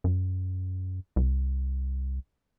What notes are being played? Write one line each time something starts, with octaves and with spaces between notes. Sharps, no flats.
F#2
C2